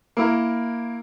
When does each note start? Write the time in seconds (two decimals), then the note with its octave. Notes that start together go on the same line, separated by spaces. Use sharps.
0.17 A#3 E4 A#4